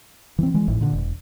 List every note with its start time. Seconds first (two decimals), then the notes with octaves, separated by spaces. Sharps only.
0.39 E3 G3 C4
0.54 E3 G#3
0.68 G#1 A2 E3
0.81 A#2 D3
0.93 E1